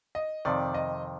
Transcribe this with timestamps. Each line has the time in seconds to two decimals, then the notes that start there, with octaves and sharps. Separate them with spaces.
0.15 D#5
0.45 F2 C3 D#3 D5
0.74 D#5